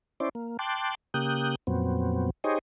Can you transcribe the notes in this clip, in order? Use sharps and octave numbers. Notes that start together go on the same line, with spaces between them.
C#4 E4 C5 D5
A#3
G5 A5 C6 D6 F#6
C#3 A#3 G4 D#6 F#6 G6
F2 A#2 F#3 B3 C4
D#4 G4 G#4 C5 C#5 D#5